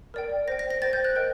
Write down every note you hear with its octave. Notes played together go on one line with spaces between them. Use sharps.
A#4 D5 G5
C5 G5 A#6
A#6
A#6
C5 G5 A6
G6
F#6
A#4 D#5 G5